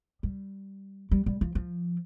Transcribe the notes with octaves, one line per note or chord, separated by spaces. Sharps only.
G3
G3
G3
F3
F3